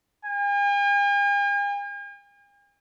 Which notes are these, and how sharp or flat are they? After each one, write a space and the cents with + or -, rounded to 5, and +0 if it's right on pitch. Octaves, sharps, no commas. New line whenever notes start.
G#5 -45